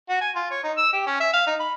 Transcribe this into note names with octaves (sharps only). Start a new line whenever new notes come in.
F#4
G#5
F4
C#5
D#4
E6
G4
C#4
E5
F5
D#4
B5